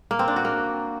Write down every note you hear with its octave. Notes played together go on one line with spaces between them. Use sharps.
A#3
C4
D4
F#4
A#3